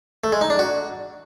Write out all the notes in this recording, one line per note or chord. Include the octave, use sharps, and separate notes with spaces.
A3
G#3
D#4
D4
F#4